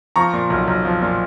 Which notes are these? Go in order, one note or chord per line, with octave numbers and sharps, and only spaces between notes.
F3 A#5 C#6
A#2
B1
B1
F3
A#2